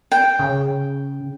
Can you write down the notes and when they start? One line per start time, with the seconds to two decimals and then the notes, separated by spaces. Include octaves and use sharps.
0.12 G5
0.39 C#3